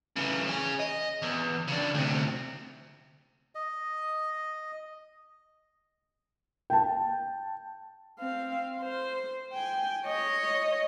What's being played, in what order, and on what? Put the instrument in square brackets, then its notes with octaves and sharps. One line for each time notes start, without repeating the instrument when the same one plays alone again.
[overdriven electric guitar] C#3 E3
C#4 G#4
D#5
E2
C#3 D4
D2 C3
[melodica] D#5
[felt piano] G5 A5
[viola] C4 F5
C5
G5 G#5
C#5 D#5